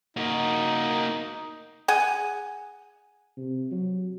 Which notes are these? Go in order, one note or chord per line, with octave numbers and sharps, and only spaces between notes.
A#3 D#4 F#4
G#4 F#5 G#5
C3
F#3